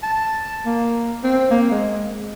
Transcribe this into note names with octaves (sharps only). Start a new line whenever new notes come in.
A5
A#3
C4
A#3
G#3